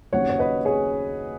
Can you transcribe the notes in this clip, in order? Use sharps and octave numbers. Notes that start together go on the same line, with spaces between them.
D#2 C#3 F#3 C#5 F#5
C#5
B4 D#5
G#4 C#5